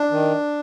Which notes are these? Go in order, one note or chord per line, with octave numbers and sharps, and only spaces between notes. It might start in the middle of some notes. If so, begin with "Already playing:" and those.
Already playing: D4
D#3